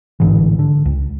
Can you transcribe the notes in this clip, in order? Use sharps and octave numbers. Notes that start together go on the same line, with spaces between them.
A1 G#2 D3 E3
D3
C#2